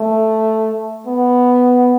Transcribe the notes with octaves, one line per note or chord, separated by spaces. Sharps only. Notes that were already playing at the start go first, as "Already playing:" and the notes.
Already playing: A3
B3